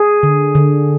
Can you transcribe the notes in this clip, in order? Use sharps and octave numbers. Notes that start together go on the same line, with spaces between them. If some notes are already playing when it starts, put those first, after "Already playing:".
Already playing: G#4
D3
D3